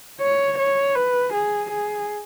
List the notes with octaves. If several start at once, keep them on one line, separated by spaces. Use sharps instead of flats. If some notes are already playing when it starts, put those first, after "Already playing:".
C#5
C#5
B4
G#4
G#4